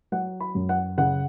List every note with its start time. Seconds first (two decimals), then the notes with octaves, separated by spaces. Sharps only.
0.12 F#3 F#5
0.40 B5
0.55 F#2
0.69 F#5
0.98 C#3 F#5